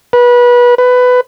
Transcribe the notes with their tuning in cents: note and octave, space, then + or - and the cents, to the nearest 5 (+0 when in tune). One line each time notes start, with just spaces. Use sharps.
B4 -25
B4 +15